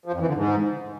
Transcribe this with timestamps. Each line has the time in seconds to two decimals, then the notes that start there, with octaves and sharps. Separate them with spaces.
0.06 F3
0.13 F2
0.20 E3
0.28 D3
0.35 G#2